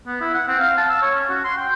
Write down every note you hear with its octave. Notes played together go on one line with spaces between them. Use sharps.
B3
E4
F#5
C4
F5
A5
E6
C#5
C#4
F#4
C6
G5